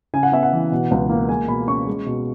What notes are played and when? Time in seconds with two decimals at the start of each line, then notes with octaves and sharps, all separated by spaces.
0.14 C#3 G#5
0.23 F#5
0.32 B3 E5
0.43 F#5
0.53 E3
0.72 B2
0.91 C#2
1.09 A#3
1.29 G#3 G#5
1.48 B2 B5
1.68 C#4 C#6
1.87 G#3
2.06 B2